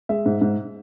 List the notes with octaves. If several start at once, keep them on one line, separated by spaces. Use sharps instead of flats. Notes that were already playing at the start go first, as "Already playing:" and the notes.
G#3 E5
G#2
G#2